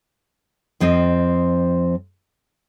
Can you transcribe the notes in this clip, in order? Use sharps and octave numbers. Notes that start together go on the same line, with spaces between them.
F2 F3 C4 D#5